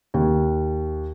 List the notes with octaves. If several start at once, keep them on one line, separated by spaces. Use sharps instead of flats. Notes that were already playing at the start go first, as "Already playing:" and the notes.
D#2